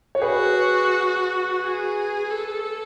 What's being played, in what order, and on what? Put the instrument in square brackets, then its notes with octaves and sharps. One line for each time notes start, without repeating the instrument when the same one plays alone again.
[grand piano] C#5
[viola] F#4 [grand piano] G#4 B4
[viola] G#4
A4